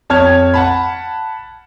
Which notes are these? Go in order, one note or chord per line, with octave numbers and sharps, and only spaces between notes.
F2 C#5 A5 F6 G#6
F#5 A5 B5